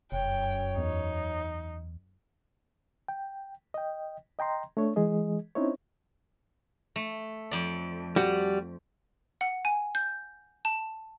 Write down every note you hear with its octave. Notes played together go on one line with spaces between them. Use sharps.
F1 F#2 C#5 G5
E2 D#4
G5
D#5 G5
D#5 G5 A#5 C6
A3 D4 C#5
E3 G#3 G#4 D#5
C4 C#4 D#4 E4 C5 C#5
A3
F2 D5
G3 F#4
F#5
G#5
G6
A5